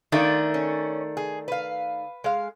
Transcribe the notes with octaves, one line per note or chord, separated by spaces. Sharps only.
D#3 A3 D4 F4
C#4
G#4
B4 F5
G#3 F5